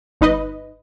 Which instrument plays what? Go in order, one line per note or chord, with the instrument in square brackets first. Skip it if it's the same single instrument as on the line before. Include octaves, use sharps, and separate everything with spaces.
[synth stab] G1 D#4 B4 D#5